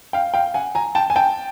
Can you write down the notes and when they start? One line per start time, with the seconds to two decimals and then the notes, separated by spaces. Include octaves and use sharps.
0.13 F5 G5
0.34 F5 G5
0.54 F#5 G#5
0.75 G#5 A#5
0.95 G5 A5
1.10 G#5
1.15 G5 A5